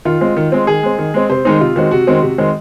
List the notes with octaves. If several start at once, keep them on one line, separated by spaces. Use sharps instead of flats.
D#3 F4
G#3 C4
D#3
G#3 C4
D#3 G#4
G#3 C4
D#3
G#3 C4
C3 C5
D#3 G#3 C4 D#4
C3 F4
D#3 G#3 C4 F#4
C3 F#4
D#3 G#3 C4
C3
D#3 G#3 C4